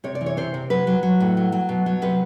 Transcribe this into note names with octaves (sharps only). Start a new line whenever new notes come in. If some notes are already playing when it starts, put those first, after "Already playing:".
C3 C#5
D5
E3
C#5
C3 C5
C3
F#3 B4
F#3
F#3
A2
F#3
F#3
B2
F#3
C3 B4